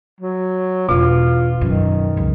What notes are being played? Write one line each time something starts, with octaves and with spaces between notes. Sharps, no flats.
F#3
E1 B2 F4
F#2 D#3
C#2 F#2